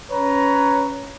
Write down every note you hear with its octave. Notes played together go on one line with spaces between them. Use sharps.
C#4 B4 C#5 A#5